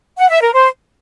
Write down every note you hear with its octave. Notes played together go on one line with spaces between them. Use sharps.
F#5
E5
A#4
C5